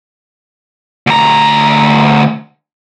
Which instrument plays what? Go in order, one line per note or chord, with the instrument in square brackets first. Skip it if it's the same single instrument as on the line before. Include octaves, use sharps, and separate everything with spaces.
[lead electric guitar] D2 A#5